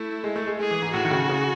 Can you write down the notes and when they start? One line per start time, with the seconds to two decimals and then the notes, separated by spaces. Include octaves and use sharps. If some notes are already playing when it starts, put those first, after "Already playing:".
Already playing: A3 E4
0.24 G#3
0.36 A3
0.47 G#3
0.59 G#3 G#4
0.71 E3
0.82 G#2
0.93 A2 F#4
1.05 D#3
1.11 C#3
1.29 C#3